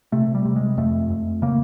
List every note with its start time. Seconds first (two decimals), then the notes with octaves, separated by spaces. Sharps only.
0.12 C3 A3
0.35 G3
0.45 C3
0.56 G#3
0.77 F2 A3
1.10 F2
1.42 C#3 A#3